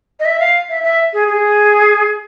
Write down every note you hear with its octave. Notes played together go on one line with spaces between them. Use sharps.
D#5
E5
F5
E5
E5
G#4
G#4